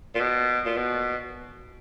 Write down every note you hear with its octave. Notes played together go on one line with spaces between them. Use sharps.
A#2
B2
A#2
B2